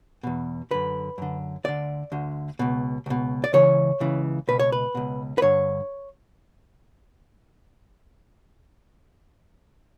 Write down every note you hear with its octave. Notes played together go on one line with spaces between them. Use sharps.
E2 B2
F#2 D3 B4
F#2 D3
D2 D3 D5
D2 D3
C#2 B2
C#2 B2
D5
C#2 C#3 E3 C#5
C#2 C#3 E3
C#2 B2 B4
C#5
B4
C#2 B2
B4
G2 D3 C#5